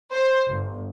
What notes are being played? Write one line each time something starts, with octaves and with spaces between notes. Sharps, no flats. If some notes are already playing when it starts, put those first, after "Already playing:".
C5
G1